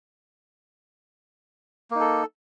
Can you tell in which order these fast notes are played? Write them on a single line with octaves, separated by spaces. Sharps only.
A#3 D#4 A4